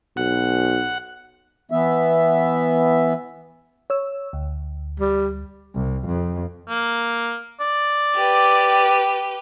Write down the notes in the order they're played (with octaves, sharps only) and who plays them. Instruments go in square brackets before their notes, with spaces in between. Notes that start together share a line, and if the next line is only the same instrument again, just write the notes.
[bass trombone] B1 [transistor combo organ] F#5
[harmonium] E3 B3 E5
[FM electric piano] C#5 E6
D2
[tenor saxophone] G3
[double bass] C2
F2
[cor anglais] A#3
D5
[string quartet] G4 B4